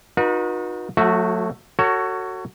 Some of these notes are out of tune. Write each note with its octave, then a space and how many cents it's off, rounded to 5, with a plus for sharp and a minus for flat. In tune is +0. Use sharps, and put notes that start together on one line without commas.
D#4 +0 F#4 -35 B4 -45
F#3 -40 A3 +5 F#4 +0
F#4 +10 A4 +35 C#5 +0